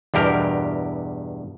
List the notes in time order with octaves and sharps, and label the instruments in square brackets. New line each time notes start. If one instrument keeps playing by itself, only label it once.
[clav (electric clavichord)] E2 G2 B2 G4 A#4